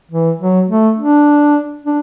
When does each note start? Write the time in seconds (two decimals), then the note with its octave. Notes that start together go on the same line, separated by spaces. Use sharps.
0.11 E3
0.40 F#3
0.69 A3
0.98 D4
1.84 D4